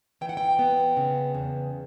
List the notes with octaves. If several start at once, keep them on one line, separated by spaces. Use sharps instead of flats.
E3 G5
F#5
G5
B3
C#3
E2